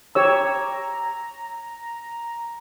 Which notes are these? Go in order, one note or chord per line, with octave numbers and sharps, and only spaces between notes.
G4 C#5 A#5 E6